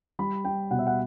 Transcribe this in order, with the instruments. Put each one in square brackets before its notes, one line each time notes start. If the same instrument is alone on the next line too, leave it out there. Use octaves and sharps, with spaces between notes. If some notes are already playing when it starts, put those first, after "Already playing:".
[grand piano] G3 B5
G3 G5
B2 F#5
E5
F#5